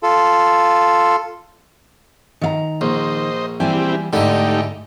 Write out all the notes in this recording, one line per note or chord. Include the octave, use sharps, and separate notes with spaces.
F4 A4
D#3 F5 A#5
A#1 C5 D#5
E3 G3 C4 E4 G4 G#5
G#2 D3 A3 D#4 E4 G4 G#5